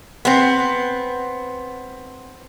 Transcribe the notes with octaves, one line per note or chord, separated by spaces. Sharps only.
B3 C4